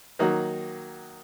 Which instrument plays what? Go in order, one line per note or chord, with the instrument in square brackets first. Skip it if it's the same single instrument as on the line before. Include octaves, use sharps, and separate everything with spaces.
[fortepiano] D#3 F#3 A#3 D#4 F#4